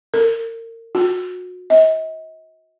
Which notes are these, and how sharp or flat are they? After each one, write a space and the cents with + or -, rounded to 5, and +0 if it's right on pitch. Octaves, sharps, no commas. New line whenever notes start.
A#4 -30
F#4 -35
D#5 +45